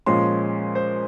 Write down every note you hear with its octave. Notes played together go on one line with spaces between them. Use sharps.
A#2 F3 G#3 C#4 C6
C5